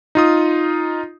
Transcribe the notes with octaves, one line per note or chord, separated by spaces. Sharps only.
D#4 F4 D#6